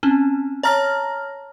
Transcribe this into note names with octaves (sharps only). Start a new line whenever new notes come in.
C4 C#4
C#5 A5 A#5 F6 A#6